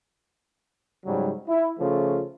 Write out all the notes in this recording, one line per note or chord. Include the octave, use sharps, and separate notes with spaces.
G#2 C#3 F#3 G3
E4
C#3 F3 A3 F4